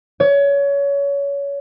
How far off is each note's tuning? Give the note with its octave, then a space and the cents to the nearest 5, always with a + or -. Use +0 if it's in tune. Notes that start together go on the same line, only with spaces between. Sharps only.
C#5 +25